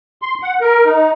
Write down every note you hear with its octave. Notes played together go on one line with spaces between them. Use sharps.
C6
F#5
A#4
D#4